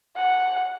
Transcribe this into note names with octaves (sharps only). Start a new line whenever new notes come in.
F#5